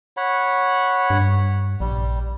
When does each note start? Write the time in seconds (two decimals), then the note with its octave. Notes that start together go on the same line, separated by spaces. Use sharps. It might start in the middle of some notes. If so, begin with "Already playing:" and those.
0.17 C#5 F#5 B5
1.10 G2
1.80 A#1 G3